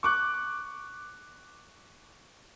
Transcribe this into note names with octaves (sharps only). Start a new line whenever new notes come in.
C#6 D6 F#6